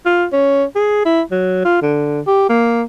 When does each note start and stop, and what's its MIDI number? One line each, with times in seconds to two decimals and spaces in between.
0.06 0.26 65
0.33 0.64 61
0.76 1.02 68
1.05 1.22 64
1.31 1.63 54
1.65 1.82 65
1.82 2.21 50
2.27 2.48 67
2.49 2.83 58